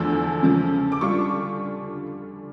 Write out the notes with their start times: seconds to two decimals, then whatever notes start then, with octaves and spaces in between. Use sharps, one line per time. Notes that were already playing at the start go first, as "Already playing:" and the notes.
Already playing: E2 D3 F3 A3 E6
0.43 C#3 F3 C#4
0.92 D6
1.01 D3 G3 D4 F4 C#6